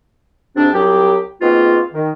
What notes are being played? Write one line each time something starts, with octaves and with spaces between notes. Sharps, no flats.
F2 G#2 C3 C4 D4
C2 F#3 G4 G5
G#2 B2 G#3 A#3 C4 F4
D#3